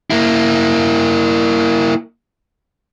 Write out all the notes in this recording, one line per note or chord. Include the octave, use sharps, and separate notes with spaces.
A#3 E4